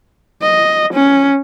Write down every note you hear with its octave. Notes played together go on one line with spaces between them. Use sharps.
D#5
C#4